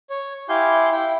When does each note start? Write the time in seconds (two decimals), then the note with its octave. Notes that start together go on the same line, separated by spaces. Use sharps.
0.10 C#5
0.49 E4 G4 F5 G#5 C6 G6
0.92 E4 G5